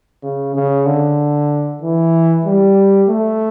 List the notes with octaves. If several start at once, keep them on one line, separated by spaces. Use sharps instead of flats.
C#3
C#3
D3
E3
G3
A3